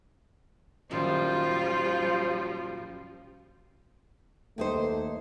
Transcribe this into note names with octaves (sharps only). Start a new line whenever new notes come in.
F#2 A#2 D#3 F3 G3 F4 C5
D#2 A3 D#4 C5